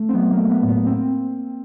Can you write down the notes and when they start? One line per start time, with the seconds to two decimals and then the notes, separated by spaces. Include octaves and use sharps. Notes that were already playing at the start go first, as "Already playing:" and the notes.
Already playing: A3
0.09 C4
0.14 F#3 B3
0.32 A#3
0.38 A3
0.50 B3
0.62 A2
0.68 B3
0.86 A#3 C4